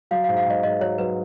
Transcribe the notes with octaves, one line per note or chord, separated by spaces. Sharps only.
F#3 F5
F5
G#2
F5
G#2 D#5
G#2 D#5
F#3 C#5
F#3 B4